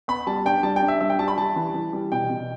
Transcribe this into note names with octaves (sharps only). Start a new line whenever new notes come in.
B3 B5
G3 A5
D4 G5
G3 A5
G5
D4
E5
G3 E5
G5
G3 A5
B5
G3 A5
E3
E3
G3
B2 G5
B2